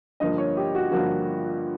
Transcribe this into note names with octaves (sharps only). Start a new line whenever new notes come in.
G2 D3 F3 A#3 D#5
C#5
G4
F#4
G2 D3 F3 A#3 F#4